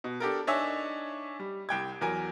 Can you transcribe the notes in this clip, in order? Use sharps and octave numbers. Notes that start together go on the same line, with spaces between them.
B2
D4 G4 A4 A#4
D4 D#4 C#5 D#5 E5 G#5
G3
C2 G5 G#6
E2 F#3 A#4 G#5